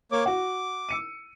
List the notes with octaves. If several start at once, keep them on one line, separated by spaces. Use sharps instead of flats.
A#3 C#5 D6
F#4 F#5 D6
E6 C#7 D#7